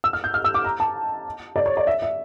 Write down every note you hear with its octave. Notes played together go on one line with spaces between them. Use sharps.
E6
F6
G6
F6
E6
D6
A#5
A5
D5
C#5
D5
E5
E5